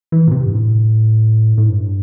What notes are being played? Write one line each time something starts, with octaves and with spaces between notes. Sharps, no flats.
E3
A#2
C3
G2
A2
A2
G2